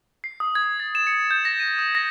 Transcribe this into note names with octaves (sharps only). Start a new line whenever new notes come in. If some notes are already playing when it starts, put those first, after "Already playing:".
C7
D#6
G#6
A6
E7
C#7
G6
A#6
D#7
D#6
A#6